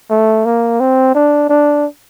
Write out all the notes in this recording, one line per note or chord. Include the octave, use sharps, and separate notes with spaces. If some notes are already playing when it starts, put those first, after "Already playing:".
A3
A#3
C4
D4
D4